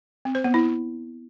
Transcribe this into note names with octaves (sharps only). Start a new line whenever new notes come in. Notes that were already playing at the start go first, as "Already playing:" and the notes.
C4
C5
B3
E4